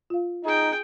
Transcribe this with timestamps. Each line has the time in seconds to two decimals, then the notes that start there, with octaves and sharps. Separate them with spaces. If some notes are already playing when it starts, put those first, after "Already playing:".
0.10 F4 F5
0.44 D#4 G#4 G5